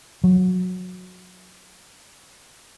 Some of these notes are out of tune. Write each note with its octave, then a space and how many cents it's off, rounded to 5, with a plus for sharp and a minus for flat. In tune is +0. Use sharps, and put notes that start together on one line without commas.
F#3 -15